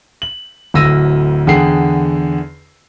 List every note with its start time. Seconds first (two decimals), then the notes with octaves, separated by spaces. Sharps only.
0.22 F#7
0.74 D1 D2 E6 A#6 D#7
1.47 E2 D3 G#4 F#5 G5 C7